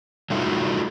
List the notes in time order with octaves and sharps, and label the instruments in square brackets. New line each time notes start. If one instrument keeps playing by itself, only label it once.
[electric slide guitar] F#3 G3 A3 D#4 F4 F#4